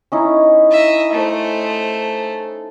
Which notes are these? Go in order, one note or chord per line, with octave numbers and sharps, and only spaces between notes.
C#4 D#4 E4
D#5 E5
A3 C5